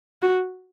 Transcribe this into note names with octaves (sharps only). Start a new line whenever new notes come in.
F#4